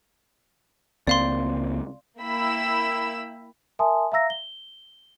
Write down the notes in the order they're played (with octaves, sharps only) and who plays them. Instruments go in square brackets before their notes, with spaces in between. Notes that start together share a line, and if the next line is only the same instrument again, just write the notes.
[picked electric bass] C#2 A#3 C4 [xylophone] D5 F5 C6
[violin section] A#3 E4 G5 B5 E6
[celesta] A#4 E5 G#5 A5 C6 D#6
E5 F5 A#5 E6 A#6
G7